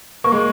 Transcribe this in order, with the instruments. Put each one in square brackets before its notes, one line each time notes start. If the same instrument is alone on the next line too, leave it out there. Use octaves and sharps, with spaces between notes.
[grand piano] A#3 [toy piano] C#6
[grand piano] G#3